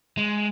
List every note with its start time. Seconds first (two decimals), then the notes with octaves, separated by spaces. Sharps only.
0.17 G#3